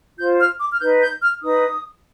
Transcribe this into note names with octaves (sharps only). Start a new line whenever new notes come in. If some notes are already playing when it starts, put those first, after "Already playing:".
F4 C5 G6
F6
D6
F6
D#4 B4 G6
G6
F6
D#4 B4 D#6